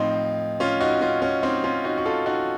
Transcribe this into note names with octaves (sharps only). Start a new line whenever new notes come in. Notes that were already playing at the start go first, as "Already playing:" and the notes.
Already playing: A2 F3 C4 D#4
C#4 F4
D#4 F#4
C#4 F4
C#4
C4 D#4
C#4 F4
D#4 F#4
F#4
F4 A4
D#4 F#4